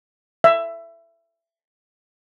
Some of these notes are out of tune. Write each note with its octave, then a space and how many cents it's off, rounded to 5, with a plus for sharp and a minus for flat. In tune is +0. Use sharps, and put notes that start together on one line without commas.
E5 +20